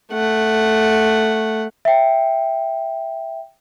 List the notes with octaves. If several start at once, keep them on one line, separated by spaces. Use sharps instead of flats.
A3 F#5
E5 G5